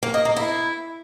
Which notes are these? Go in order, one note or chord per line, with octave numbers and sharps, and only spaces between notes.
A#3
D#5
A#3
E4